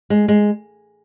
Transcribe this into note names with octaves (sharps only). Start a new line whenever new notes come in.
G#3
G#3